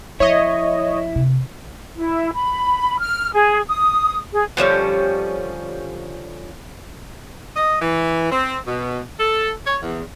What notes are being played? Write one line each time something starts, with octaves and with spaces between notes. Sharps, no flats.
F3 E4 C#5 D#5
C3
E4
B5
F6
G#4
D#6
G#4
D3 F3 G3 C#4
D#5
E3
C4
B2
A4
C#5
E2